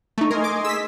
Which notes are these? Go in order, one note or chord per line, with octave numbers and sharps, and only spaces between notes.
A3 D#4 C#6
A3 A#4 D#5 G#5 C6
D6
G#4 E6 B6